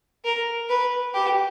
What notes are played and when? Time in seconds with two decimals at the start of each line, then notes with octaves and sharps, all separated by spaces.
0.25 A#4
0.69 B4
1.14 G4